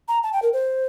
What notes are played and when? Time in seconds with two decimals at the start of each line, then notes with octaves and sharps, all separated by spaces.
0.08 A#5
0.23 A5
0.33 G5
0.42 A#4
0.53 C5